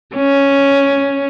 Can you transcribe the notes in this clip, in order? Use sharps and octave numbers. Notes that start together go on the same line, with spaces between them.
C#4